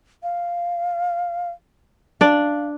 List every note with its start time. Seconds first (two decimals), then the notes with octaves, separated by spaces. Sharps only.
0.23 F5
2.21 D4 D5 F5